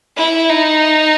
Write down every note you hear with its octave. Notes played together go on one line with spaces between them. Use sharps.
E4
D#4